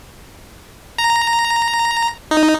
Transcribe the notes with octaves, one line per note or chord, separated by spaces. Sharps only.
A#5
D#4